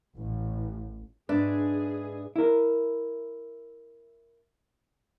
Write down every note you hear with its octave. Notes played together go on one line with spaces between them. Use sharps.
A1
G#2 D4 G#4 B4 D5 E5
E4 A#4